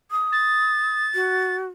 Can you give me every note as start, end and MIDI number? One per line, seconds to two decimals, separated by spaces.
0.11 1.04 87
0.32 1.56 93
1.15 1.68 66